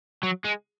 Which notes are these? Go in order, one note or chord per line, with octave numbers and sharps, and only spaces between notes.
F#3
G#3